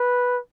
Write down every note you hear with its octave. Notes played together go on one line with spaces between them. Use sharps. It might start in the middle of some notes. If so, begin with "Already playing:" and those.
Already playing: B4